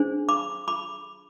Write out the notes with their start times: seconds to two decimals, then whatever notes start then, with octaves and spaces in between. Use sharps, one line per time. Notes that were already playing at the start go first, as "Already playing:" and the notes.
Already playing: D4 G#4 C5
0.29 B5 D6
0.68 B5 D6